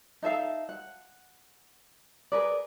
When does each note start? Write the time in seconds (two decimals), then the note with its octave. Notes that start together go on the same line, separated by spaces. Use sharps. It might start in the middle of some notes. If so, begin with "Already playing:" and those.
0.22 D#4 A4 E5 F5
0.69 F#5
2.32 G#4 A#4 B4 D5